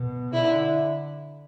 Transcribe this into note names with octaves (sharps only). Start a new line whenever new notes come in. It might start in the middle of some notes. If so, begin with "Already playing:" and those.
Already playing: B2
D3 E4